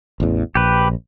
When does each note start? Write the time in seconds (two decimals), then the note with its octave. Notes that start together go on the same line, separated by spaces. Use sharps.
0.20 A1 E2
0.55 A#1 G4 B4